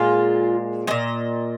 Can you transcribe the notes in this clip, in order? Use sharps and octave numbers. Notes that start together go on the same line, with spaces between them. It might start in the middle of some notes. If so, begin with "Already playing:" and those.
Already playing: A#2 G#3 F4
A#2 G#3 D#5